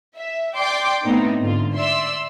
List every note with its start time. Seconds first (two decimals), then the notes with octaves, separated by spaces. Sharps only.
0.17 E5
0.57 D5 G5 C6 D6
1.05 A2 B3 C4 D#4
1.41 G#2 D3 F4
1.75 D5 E5 C6 E6